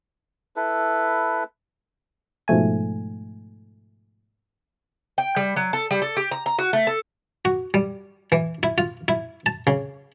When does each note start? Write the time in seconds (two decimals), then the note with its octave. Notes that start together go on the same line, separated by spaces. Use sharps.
0.56 E4 A4 B4
2.48 G#2 B2 F3 A3 G#5
5.18 G5
5.36 G3
5.56 F#3
5.73 A4
5.91 G3
6.02 A4
6.17 G4
6.31 A#5
6.46 A#5
6.59 F#4
6.73 A3
6.87 A4
7.45 F#4
7.74 G3
8.32 E3
8.63 E4
8.78 F4
9.08 E4
9.46 A5
9.67 C#3